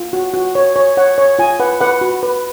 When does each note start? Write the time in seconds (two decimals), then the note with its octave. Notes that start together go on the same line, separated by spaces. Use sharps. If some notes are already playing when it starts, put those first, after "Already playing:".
Already playing: F4
0.13 F#4
0.34 F#4
0.55 C#5
0.76 C#5
0.97 C#5 F#5
1.18 C#5
1.39 F4 G#5
1.60 B4 F#5
1.81 B4 F#5
2.01 F#4
2.23 B4